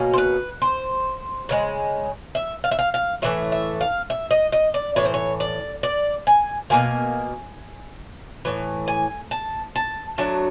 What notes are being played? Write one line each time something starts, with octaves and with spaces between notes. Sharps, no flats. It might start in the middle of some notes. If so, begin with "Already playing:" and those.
Already playing: B2 A#3 C#4
C5
B4
C5
C#3 F3 G#3
E5
F5
E5
F5
F5
A2 E3 A3 E5
E5
F5
E5
D#5
D#5
D5
A2 E3 C#5
C5
C#5
D5
D5
G#5
B2 G3 A#3 G#5
A2 E3
G#5
A5
A5
F#3 A3 D4 A5